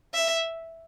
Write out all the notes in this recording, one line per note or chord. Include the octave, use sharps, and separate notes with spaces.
E5